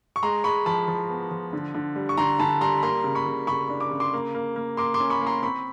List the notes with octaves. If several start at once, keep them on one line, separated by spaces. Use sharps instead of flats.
C#6
G#3 A#5 C6
G#3 B5 C#6
F3 A5 B5
F3
B3
F3
D3
D3
G3
C#6
D3 A#5 C6
D3 A5 B5
G3 A#5 C6
B5
A#3 A#5 C6
C#3
B5 C#6
C#3
C#3 B5 C#6
D4
D6
C#3
C6 D6
A#3
A#3
A#3
A#3 C6 D6
C6 D6
C#4
B5 C#6
A#3
A#5 C6
C4 B5 C#6